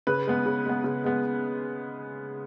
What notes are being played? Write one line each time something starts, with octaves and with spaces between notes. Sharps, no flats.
C#3 B4
G#3 B3
C#3
G#3 B3
C#3
G#3 B3